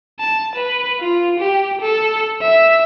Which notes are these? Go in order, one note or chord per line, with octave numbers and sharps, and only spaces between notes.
A5
B4
F4
G4
A4
E5